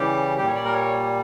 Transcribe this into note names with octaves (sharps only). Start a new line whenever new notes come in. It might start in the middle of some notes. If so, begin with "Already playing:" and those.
Already playing: C#3 E3 G3 G4
A#2 G3 G4
C#5
D5
A#4
C#5